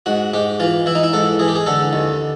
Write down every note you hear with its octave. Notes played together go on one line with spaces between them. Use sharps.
G#2 F#4
G#2 G4
E3 F4
E3 E4
D#4
E4
G#2 A4
E3 G#4
G4
G#4
D3 A4
D#2